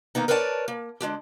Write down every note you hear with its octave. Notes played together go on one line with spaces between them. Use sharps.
D#3 A#3 B3 D#4
A#4 B4 C#5 D5 F#5 A5
A#3
D3 G#3 D4 G4